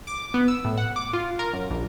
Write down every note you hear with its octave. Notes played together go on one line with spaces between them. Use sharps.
D6
B3
E6
A2
F#5
D6
F4
A#4
F#2
A#1